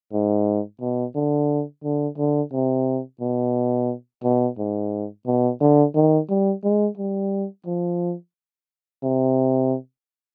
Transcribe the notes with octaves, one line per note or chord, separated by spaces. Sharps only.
G#2
B2
D3
D3
D3
C3
B2
B2
G#2
B2
D3
D#3
G3
G#3
G3
F3
C3